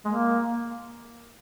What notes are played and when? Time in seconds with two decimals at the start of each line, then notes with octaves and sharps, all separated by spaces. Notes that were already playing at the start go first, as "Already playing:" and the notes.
0.05 G#3
0.08 A#3